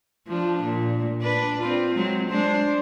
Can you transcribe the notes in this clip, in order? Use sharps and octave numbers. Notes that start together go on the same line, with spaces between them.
F3 D4
A#2
D4 B4 D5
C4 F4
F#3 G#3 C4
G#3 D4 C5